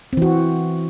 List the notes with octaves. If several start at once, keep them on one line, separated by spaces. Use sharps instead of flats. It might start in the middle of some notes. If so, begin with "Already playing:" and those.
E3 C4 F#4